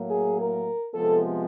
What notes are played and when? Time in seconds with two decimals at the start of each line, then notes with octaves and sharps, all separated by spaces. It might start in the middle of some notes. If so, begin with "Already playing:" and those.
Already playing: A2 F#3 A#3
0.10 G#4
0.39 A#4
0.94 C3 F3 G#3 B3 A4